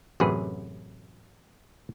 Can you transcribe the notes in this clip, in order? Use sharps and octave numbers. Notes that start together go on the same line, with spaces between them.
A1 F#2 C3 F#3 G#4 B4